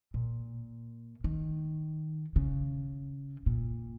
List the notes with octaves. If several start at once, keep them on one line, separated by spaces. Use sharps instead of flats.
A#2
D#3
C#3
A#2